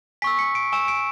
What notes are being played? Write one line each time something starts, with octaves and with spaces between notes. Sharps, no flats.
G#5 C#6 E6 B6
C#7
D7
G#5 C#6 E6 E7
D7